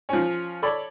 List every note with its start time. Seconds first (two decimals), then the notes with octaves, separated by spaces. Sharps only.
0.09 F3 C#4
0.62 A4 C#5 D5 B5